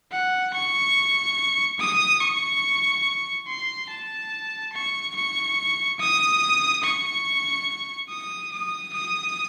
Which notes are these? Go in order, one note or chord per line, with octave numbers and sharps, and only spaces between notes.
F#5
C#6
D#6
C#6
C6
A5
C#6
C#6
D#6
C#6
D#6
D#6
D#6